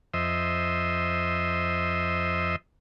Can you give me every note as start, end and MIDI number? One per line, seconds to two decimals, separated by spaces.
0.14 2.56 41
0.14 2.56 72
0.14 2.56 75
0.14 2.56 76